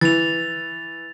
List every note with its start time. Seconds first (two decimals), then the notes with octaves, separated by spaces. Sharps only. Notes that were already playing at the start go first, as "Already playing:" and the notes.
0.01 E3 A6 F7